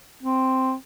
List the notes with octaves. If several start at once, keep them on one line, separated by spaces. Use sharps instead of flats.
C4